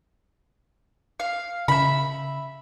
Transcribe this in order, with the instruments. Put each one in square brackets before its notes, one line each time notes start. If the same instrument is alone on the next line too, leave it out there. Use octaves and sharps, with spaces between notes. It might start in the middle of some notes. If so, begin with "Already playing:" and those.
[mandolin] F5
[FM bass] C#3 [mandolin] E5 B5